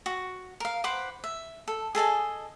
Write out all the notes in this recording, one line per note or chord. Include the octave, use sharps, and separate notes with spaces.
F#4
A#4 F5
B4 C5 F#5 D6
E5
A4
G#4 A4 D#5 G#5